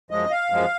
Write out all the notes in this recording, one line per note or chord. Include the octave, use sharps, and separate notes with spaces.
F#2 F3 G#3 D#5
F5
F#2 F3 G#3